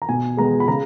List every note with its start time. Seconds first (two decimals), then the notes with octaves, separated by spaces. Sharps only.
0.02 A#5
0.09 B2 G#5
0.37 G#3 B3 A#5
0.60 B5
0.68 C#3 A#5